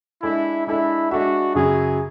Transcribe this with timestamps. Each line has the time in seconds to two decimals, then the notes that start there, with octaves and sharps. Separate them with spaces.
0.22 G#3 D4 E4 A4 E5
0.67 G#3 D4 E4 A4 E5
1.11 G#3 D4 F#4 A4 E5
1.54 F#2 C#3 F#3 G#4